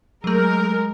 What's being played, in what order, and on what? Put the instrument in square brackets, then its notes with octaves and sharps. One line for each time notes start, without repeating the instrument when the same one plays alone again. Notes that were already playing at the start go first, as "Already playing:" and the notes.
[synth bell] F#3 A3 [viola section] G#3 A#4